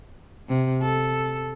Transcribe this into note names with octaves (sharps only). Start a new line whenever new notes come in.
C3
A4